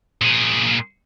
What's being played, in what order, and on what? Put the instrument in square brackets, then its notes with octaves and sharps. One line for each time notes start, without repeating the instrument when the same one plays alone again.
[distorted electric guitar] A#2 G#4